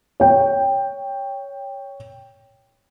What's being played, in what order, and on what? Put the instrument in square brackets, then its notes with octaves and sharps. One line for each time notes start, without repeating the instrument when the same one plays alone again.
[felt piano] C#5 G5